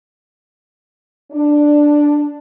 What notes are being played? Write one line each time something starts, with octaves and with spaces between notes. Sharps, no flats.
D4